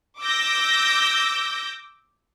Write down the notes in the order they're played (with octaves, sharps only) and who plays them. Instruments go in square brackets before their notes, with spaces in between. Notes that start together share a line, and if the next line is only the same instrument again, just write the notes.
[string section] D6 E6 G6 A#6